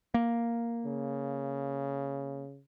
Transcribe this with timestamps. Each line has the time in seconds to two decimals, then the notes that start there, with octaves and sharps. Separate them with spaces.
0.14 A#3
0.86 C#3